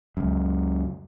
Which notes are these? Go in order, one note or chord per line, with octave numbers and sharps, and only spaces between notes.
C#2 F#2